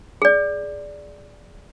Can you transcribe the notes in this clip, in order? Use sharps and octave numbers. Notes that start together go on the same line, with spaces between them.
G#4 D5